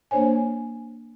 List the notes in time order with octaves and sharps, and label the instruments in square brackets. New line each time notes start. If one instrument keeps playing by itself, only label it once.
[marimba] A#3 D4 C5 C#5 G#5